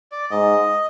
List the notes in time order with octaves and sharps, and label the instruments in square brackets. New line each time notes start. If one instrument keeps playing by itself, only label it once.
[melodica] D5
[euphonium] G#2 [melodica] D#5